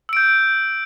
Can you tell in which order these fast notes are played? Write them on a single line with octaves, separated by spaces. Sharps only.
E6 D7 G6